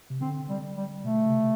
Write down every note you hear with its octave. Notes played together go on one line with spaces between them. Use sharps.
C3
D3 C4
G3
G3
B2 A3
C3